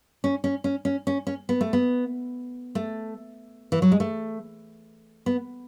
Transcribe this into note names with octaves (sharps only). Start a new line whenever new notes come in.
C#4
C#4
C#4
C#4
C#4
C#4
B3
A3
B3
A3
E3
F#3
G#3
A3
B3